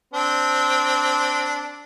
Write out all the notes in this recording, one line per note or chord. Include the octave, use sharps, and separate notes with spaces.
C4 D4